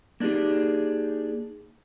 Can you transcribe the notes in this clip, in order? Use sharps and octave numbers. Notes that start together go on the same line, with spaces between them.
A#3 D4 D#4 G4 G#4